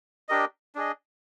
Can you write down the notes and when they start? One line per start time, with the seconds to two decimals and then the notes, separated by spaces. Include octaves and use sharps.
0.29 D4 G4 A#4 D#5
0.75 D4 G#4 D#5